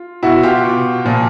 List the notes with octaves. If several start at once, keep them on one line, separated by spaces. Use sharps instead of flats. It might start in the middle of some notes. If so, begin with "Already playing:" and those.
Already playing: F4
B2 E4 F#4
F4 G4
B2
A#2 F3